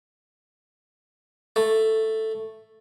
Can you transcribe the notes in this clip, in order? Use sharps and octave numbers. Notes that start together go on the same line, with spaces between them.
A3